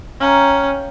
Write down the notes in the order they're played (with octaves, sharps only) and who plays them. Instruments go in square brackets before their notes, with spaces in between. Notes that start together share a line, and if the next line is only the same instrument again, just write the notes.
[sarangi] C#4 [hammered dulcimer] F5 G5 A#5